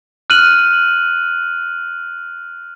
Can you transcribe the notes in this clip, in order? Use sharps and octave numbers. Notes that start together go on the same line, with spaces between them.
F6 F#6 D#7 F#7